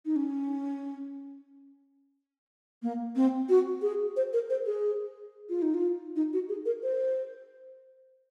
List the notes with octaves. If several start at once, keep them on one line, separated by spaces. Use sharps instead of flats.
D#4
C#4
A#3
C4
F#4
G#4
C5
A#4
C5
G#4
F4
D#4
F4
D#4
F#4
G#4
A#4
C5